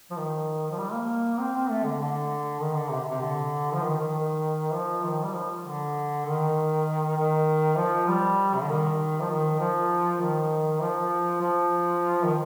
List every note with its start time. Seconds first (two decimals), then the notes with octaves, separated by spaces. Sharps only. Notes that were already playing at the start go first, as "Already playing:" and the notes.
0.11 F3
0.17 D#3
0.71 F3
0.78 G3
0.93 A#3
1.39 C4
1.55 C4
1.70 A3
1.84 D3
1.99 D3
2.61 D#3
2.75 D3
2.90 C3
3.09 C3
3.21 D3
3.74 F3
3.82 D#3
3.97 D#3
4.73 F3
5.04 D#3
5.24 G3
5.34 F3
5.65 D3
6.26 D#3
7.17 D#3
7.77 F3
8.08 G3
8.55 C3
8.62 D3
8.68 D#3
9.20 F3
9.29 D#3
9.59 F3
10.21 D#3
10.80 F3
11.41 F3
12.24 D#3